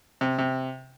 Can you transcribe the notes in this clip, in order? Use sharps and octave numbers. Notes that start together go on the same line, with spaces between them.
C3
C3